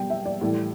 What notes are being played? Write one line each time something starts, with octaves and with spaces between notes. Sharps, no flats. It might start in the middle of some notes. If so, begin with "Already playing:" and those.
Already playing: B2 G3 G5
E5
D5
A2 E3 G3